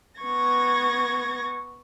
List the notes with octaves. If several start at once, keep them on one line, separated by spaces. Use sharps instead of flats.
B3 C#6 G#6 A#6